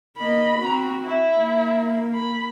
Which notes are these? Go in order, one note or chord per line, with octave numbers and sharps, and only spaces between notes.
A#3 D#5 B5
C4 F#4
E4
A#3
B5